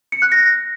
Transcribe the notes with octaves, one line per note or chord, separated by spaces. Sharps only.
C#7
F#6
A#6